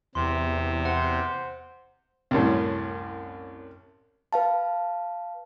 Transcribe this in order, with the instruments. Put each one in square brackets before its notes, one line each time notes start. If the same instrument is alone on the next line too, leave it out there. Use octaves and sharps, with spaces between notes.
[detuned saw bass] E2 [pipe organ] C3 [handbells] C6
[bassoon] C5 [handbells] F#5
[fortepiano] C2 F#2 A2
[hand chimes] B4 F5 A5